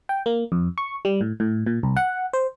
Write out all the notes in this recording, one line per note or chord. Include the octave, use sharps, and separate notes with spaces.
G5
A#3
F2
C#6
G3
A2
A2
A#2
C2
F#5
C5